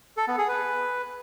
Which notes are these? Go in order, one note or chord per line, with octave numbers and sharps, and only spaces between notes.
A4
B3
G#4
B4